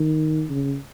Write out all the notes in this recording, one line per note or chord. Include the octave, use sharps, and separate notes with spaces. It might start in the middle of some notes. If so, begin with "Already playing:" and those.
Already playing: D#3
C#3